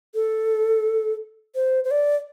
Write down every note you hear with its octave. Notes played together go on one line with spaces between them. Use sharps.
A4
C5
C5
D5